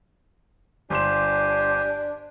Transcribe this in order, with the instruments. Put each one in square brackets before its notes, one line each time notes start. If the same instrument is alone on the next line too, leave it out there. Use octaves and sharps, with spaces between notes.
[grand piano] G1 C6 E7 [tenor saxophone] D4 [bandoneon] G4 C5 G#5